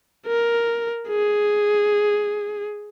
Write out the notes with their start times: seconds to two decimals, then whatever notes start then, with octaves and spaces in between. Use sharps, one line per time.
0.27 A#4
1.09 G#4